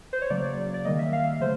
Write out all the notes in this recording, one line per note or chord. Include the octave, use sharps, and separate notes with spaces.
C5
C#5
C#3 F#3 A#3 D5
D5
D#3 G3 A#3 D#5
E5
F5
C#3 F#3 A3 C5